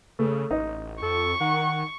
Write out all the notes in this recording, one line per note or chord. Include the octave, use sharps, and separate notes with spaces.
C#3 A3
A1 D#4
F2 A4 C#6
D#3 F#5